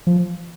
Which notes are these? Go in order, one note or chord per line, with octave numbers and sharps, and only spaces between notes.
F3